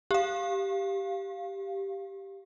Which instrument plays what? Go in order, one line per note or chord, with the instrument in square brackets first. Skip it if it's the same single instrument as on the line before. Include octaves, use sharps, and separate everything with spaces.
[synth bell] G4 F5